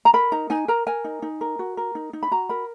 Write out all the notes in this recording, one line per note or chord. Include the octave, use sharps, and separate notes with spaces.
A#5
A#4 B5
D#4 A#5
D#4 G#5
A#4 A#5
A#4 G#5
D#4
D#4
A#4
F#4
A#4
D#4
D#4
B5
F#4 A#5
A#4 B5